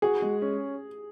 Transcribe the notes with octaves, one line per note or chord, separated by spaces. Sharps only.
F#4 G#4
G#3
C#4